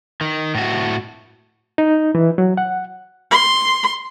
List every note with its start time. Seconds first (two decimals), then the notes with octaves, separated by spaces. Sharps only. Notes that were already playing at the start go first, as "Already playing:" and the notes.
0.21 D#3
0.55 A2 F#4
1.78 D#4
2.15 E3
2.38 F#3
2.57 F#5
3.31 C6